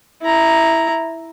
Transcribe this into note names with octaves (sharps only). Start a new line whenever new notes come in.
E4 A#5